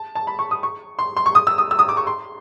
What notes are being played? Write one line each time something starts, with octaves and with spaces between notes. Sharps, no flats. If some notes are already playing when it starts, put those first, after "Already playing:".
Already playing: A5
A5
B5
C#6
D#6
C#6
C6
C6
C#6
D#6
E6
D#6
E6
D#6
D6
C#6
C6